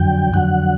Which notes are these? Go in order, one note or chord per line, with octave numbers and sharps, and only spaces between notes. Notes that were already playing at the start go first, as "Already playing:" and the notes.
Already playing: F2 D3 F#3 G5
F2 D3 F#3 F#5